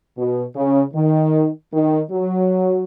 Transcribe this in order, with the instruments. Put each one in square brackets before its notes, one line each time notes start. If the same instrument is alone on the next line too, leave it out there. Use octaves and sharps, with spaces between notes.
[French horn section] B2
C#3
D#3
D#3
F#3